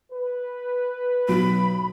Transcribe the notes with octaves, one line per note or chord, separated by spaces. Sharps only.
B4
B1 F#3 B5 D7